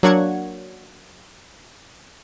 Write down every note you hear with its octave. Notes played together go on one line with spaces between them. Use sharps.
F#3 A#3 D4 F#5 C#6 G#6